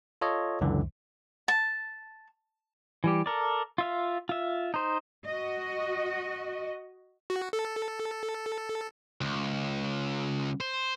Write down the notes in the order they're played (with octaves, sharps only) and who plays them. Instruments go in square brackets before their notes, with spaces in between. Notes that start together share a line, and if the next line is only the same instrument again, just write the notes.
[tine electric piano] F4 A4 C#5 D#5
C#2 F#2 D3 E3
[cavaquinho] A5
[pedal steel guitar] E3 G3 G4
A4 A#4 D5
F4 E5 F5
F4 E5
D#4 C5
[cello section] F#4 D#5
[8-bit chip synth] F#4
A4
[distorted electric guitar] C#2
C5